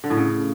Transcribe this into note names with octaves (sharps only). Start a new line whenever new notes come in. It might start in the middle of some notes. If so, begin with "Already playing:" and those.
D3
A2
C#3